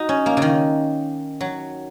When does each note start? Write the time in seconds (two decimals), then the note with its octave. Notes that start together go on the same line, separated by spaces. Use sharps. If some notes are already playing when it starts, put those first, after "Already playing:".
Already playing: D#4 F#4
0.09 C#4
0.26 A#3
0.37 C#3
0.42 D#3
1.41 F#3